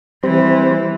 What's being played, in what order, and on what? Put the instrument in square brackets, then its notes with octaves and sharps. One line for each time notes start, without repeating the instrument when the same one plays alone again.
[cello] E3 [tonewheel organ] G3 C4 C5